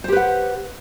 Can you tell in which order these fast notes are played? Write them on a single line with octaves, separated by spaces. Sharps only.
C5 G4 B4 F#5